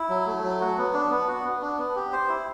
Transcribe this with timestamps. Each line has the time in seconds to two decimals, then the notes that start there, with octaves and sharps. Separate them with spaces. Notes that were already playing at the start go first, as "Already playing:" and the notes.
Already playing: E4
0.09 F#3
0.26 A3
0.44 F#3
0.61 F#4
0.78 B3
0.94 D4
1.11 B3
1.28 F#4
1.45 B3
1.62 D4
1.78 B3
1.96 G4
2.12 C5
2.29 E4